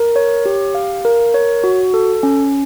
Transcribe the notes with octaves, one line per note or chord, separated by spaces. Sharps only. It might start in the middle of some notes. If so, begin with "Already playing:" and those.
Already playing: A#4
C#5
G4
F5
A#4
C#5
F#4
A4
C#4